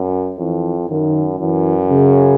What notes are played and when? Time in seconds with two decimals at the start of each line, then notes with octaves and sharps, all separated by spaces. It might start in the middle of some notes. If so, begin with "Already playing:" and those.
Already playing: F#2
0.39 F2 E3
0.89 F#2 D#3
1.40 F#2 E3
1.90 C#3